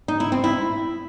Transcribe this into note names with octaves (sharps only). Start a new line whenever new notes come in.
D#4
E4
C4
E4